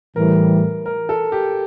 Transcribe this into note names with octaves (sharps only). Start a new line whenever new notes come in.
A2 E3 G3 A#4
A#4
A4
G4